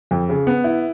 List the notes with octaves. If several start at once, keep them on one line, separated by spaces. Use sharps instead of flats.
F2
C#3
B3
E4